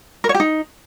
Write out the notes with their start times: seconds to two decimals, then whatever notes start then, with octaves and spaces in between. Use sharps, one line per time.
0.24 A#4
0.29 C#5
0.35 G4
0.40 D#4